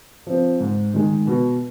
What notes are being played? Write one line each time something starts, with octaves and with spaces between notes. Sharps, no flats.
F3 C4
G#2
D#3 G#3
B2